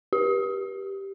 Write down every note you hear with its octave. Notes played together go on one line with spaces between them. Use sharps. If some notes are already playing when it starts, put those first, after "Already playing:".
G4